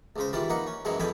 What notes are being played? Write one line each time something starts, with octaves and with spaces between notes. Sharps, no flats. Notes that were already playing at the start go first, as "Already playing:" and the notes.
C#2 C#3 C5
D#3 E3 G3 F4 B4
A#3 D#4 B4 F#5
C#4
F#2 B2 E3 F#3 G#3 F#5
F2 B2 D3 G5 G#5 B5